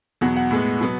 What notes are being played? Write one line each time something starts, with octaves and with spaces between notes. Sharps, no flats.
E2 B2 F#3 F#5
F#5
A2 G#3 B3
B2 F#3 B3